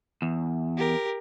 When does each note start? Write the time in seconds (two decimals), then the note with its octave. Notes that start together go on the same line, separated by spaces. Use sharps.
0.22 E2
0.78 G4 A#4